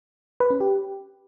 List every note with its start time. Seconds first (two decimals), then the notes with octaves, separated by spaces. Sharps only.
0.40 B4
0.50 C#4
0.60 G4